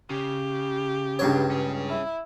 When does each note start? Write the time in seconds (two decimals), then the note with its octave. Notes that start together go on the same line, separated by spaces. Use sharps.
0.10 C#3 G4
1.19 C#2 G2 C#5
1.51 C#4 G#4
1.89 E4